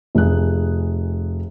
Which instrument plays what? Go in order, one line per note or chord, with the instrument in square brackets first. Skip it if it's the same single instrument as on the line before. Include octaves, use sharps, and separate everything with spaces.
[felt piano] F1 G#4 F#6